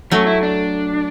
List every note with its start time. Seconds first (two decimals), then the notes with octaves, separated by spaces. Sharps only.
0.11 F#3 A3 C#4
0.27 E4
0.43 D4